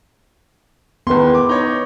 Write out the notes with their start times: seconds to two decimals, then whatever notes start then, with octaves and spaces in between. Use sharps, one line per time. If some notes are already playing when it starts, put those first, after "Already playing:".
1.07 E2 D#3 B3 B4 C6
1.35 D6
1.49 D#4 C#5